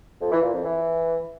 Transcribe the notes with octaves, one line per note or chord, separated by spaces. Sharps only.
F2
E3
A#2
F2
E3